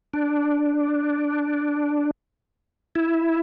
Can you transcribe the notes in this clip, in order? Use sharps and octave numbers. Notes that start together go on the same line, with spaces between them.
D4
E4